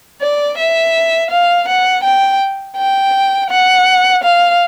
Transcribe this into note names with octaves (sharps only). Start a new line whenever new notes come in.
D5
E5
F5
F#5
G5
G5
F#5
F5